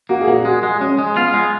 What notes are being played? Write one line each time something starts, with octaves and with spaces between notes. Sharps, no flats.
A#3 F#4
G#4
A#2
F#4
G#3 F#4
G#3
G#3 C#4
G#3
B3 F4
G#3